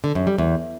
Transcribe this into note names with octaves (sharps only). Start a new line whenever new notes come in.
D3
F#2
G3
E2